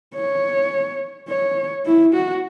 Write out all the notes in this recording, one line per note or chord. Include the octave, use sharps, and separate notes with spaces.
C#5
C#5
E4
F#4